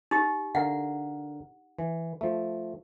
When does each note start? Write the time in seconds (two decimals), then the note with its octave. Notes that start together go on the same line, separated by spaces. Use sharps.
0.11 D#4 G4
0.55 D3 A#4 F5 F#5
1.79 E3
2.21 F3 A3